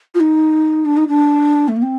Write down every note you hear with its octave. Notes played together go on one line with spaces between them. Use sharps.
F4
D#4
D4
D#4
D4
A3
A#3
C4